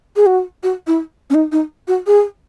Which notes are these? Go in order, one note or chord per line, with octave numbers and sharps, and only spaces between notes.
G#4
F#4
F#4
E4
C#4
D#4
D#4
F#4
G#4